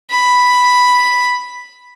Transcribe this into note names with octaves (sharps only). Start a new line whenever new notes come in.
B5